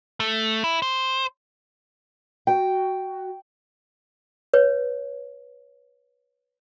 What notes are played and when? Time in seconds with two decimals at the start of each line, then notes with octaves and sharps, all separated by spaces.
0.20 A3
0.64 E4
0.82 C5
2.47 F#4 G5
4.54 B4 C#5